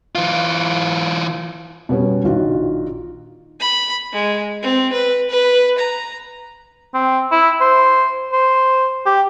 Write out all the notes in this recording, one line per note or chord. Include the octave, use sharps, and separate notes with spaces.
E3 F4
B2 G3 B3 C#4
A#1 D#3 F4 F#4
B5
G#3
C4
B4
B4
A#5
C4
E4
C5
C5
G4